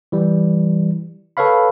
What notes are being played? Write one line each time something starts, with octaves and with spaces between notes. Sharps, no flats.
E3 G3
A4 B4 C#5 F5 B5